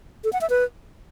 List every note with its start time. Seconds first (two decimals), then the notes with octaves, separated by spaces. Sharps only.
0.24 A4
0.33 F#5
0.41 E5
0.50 B4